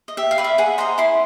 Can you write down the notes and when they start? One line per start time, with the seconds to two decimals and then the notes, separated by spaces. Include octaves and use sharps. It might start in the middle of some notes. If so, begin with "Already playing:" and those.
0.08 D#5
0.17 G4 E5
0.31 F5
0.38 B4 D5
0.44 E5
0.58 G#4 F#5
0.78 C5 D#5 A#5
0.98 E4 C6